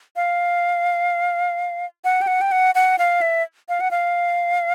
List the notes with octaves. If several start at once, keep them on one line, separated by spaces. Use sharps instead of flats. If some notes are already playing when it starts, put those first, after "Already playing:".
F5
F#5
G5
F#5
G5
F#5
F#5
F5
E5
F5
F#5
F5